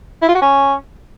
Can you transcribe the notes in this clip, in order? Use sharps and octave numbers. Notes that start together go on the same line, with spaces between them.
E4
F4
F#4
C#4